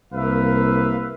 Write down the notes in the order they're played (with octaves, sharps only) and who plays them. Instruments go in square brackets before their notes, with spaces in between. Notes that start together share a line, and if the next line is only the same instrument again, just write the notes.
[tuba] C2 [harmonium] A#3 [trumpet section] B4 E5 F5